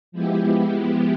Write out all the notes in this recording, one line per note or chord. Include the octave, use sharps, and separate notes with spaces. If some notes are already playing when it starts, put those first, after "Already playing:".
F3 G#3 B3 E4 G4